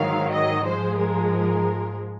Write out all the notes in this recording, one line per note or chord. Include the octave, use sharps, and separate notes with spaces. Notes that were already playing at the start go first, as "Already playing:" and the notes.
Already playing: G#2 D#3 F#3 F5
D#5
G#2 F3 G#3 C5
A#4